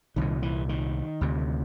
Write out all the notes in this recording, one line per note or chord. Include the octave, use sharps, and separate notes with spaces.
C2 A#2 D#3
E3
D#3
D2 C3